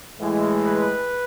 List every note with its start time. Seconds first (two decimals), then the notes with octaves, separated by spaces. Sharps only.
0.20 A2 E3 G#3
0.64 B4